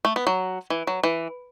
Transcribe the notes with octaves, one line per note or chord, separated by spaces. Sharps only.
A3
B3
F#3
E3
F#3
E3